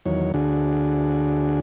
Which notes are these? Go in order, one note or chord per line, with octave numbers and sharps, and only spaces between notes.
E2 D#3 F#3 C#5
D2 D3 D4 F#4 G#4